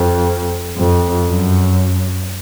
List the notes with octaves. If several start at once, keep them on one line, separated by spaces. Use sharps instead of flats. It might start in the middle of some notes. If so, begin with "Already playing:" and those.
Already playing: F2
F2
F#2